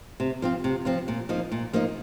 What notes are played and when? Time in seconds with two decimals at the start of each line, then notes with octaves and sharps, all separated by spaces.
0.20 C3
0.42 F3 C4 F4
0.64 C3
0.85 F3 C4 F4
1.08 A#2
1.29 F3 A#3 D#4
1.52 A#2
1.73 F3 A#3 D#4